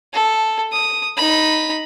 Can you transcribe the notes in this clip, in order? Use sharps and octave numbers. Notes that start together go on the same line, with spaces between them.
A4
D#6
D#4 B5